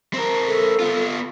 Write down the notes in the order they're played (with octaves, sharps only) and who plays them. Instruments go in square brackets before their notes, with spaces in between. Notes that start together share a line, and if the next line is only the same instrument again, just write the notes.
[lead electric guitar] C4 A#4
[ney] A4
[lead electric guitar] B3 F4